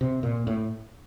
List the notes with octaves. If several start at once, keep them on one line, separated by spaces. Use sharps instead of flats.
C3
A#2
A2